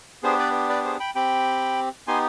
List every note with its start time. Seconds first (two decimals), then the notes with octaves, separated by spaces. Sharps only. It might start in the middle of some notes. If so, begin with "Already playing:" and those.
0.23 B3 D4 G4 G#4 C5
0.39 B4 D5
0.69 B4 D5
0.85 G#4 C5
1.00 G5 B5
1.15 C4 G4 G5 B5
2.07 B3 D#4 G4 G#5 C6